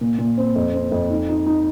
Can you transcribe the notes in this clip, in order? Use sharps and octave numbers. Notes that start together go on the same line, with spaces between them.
A#2
A#2
C4
F2
C4
F2
D#4
D#4
D#4